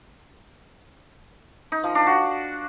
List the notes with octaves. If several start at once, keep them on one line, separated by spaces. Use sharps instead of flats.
D#4
F3
D4
F#4